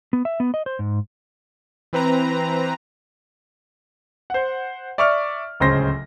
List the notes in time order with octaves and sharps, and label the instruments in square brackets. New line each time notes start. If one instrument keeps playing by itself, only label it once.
[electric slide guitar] B3
E5
B3
D#5
C5
G#2
[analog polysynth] E3 C4 B4 A#5
[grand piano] C5 F#5
D5 E5 C#6 D6 F6
D1 C#2 C#3 C5 C6 A#6